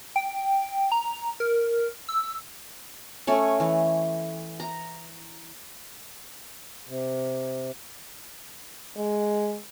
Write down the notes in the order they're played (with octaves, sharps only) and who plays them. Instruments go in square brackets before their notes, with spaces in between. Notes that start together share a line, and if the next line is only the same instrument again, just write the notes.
[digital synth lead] G5
A#5
A#4
E6
[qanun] A3 C#4 C#5
E3
A#5
[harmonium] C3
[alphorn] G#3